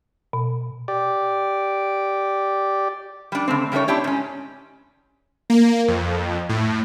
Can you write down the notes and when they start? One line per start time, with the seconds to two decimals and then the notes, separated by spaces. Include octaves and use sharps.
0.33 B2
0.88 G4 D5
3.32 G3 D4
3.48 C#3 A3 C4
3.72 C#3 G3 A3 D#4 C#5
3.88 C4 D4 E4 G4 C#5
4.04 G#2 C#4
5.50 A#3
5.88 F2
6.49 A2